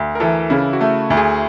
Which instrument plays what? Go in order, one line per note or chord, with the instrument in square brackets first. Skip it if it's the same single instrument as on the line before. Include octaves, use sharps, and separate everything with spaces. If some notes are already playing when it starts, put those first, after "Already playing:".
Already playing: [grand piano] D2
[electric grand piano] A#4
[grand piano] E3 [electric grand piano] A4
[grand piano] C#3 [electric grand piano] E4
[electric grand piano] F#4
[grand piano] A3
D2
[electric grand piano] G#4